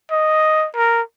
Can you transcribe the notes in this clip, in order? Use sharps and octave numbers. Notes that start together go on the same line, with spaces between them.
D#5
A#4